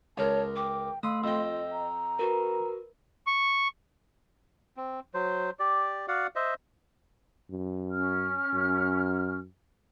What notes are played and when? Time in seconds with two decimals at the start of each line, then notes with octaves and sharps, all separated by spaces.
0.18 C#2 A#4 C#5 A5
0.56 G5 D6
1.03 A3 F5 C6 D#6 E6
1.24 F2 F4 D#5 G5 E6
1.72 A#5
2.19 F#4 A#4 B4
3.27 C#6
4.77 C4
5.14 F#3 C5
5.59 G4 D5
6.08 F#4 D5 F5 F#5
6.36 C5 D#5 E5
7.50 F#2
7.92 C#4 F6
8.53 F#2